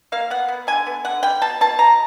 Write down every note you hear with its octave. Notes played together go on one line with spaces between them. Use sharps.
A#3 F5
B3 F#5
B3
D3 G#5
B3
D3 F#5
G3 G5
B2 A5
B2 A5
B2 A#5